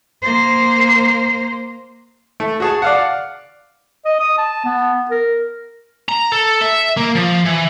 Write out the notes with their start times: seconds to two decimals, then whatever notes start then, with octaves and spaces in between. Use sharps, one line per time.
0.23 A#3 C5
2.40 A3
2.60 F#4 G#4 A5
2.82 D5 F5 F#5
4.05 D#5
4.20 D#6
4.38 A5
4.65 B3
5.11 A#4
6.09 A#5
6.32 A4
6.61 E5
6.97 A#3
7.15 F3
7.45 E3